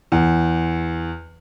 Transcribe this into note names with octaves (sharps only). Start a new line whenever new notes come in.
E2